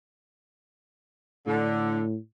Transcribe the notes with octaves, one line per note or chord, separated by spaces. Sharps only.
A2 D3